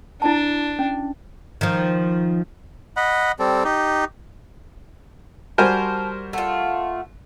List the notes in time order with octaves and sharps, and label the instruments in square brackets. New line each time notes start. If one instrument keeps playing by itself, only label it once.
[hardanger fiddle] D4 [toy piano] E4 A5
[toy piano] C#4
[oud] D#3 F3
[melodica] D#5 F#5 B5
G3 C4 A4
D#4 G4
[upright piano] G3 F#4 [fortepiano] A#4 C5 G#5 [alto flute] A5
[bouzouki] A3 F4 [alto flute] F#5